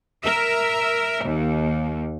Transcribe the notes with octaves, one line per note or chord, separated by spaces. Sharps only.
A#4 E5
D#2